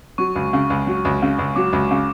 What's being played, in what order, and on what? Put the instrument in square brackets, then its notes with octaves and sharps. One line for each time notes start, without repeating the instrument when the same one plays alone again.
[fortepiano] F#3 [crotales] C#6
[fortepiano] C#2
C#3
C#2
F#3
C#2
C#3
C#2
[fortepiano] F#3 [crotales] D6
[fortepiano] C#2
C#3